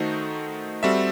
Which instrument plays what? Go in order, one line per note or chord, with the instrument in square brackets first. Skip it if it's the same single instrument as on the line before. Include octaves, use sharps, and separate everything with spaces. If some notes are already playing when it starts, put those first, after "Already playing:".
Already playing: [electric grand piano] D#3 A3 D#4 F#4 C5
G3 C4 F#4 A4 E5